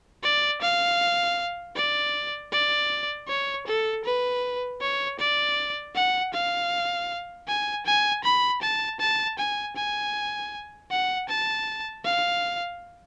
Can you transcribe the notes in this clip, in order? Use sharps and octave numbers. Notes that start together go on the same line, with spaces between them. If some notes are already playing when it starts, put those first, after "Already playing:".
D5
F5
D5
D5
C#5
A4
B4
C#5
D5
F#5
F5
G#5
G#5
B5
A5
A5
G#5
G#5
F#5
A5
F5